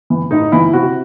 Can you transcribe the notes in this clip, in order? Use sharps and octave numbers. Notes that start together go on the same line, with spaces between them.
E3
A2 D#4
E3 E4
C3 F#4